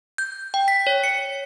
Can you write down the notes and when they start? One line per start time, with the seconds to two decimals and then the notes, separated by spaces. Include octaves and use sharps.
0.18 G6
0.54 G5
0.68 B6
0.87 C#5
1.04 C#7